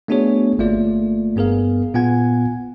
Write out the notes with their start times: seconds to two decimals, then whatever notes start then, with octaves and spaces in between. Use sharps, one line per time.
0.08 A3 B3 D4 F#4 G#4 C#5
0.59 G1 A3 A#3 F4 D5
1.36 G2 B3 G#4 A#4 F5
1.94 A#2 B3 F4 F#5 G#5 G#6